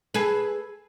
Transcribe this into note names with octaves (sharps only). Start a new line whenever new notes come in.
G#4 A4 B4